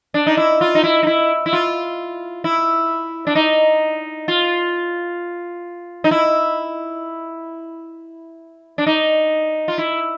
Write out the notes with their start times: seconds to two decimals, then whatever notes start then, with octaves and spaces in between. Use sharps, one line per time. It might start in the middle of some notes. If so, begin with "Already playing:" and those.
0.14 D4
0.27 D#4
0.37 E4
0.61 F4
0.75 D#4
0.84 E4
1.03 D#4
1.07 E4
1.46 E4
1.53 F4
2.44 E4
3.27 D4
3.35 D#4
4.28 F4
6.04 D#4
6.11 E4
8.78 D4
8.86 D#4
9.68 F4
9.78 E4